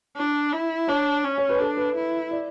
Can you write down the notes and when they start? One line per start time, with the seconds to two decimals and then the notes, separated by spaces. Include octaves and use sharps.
0.16 D4
0.53 E4
0.88 D4 C#5
1.24 C#4
1.38 C#5
1.49 B4
1.59 D4 A4
1.77 B4
1.95 E4
2.31 D5